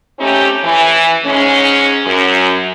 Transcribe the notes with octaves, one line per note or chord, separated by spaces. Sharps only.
A3 C4 C#4 D#4 G4
E3
G#2 G#3 C#4
F#2